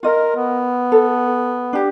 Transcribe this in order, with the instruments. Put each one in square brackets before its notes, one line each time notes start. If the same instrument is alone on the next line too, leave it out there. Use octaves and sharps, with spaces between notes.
[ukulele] F4 D#5 [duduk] A#4
[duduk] B3
[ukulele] A4
D4 G4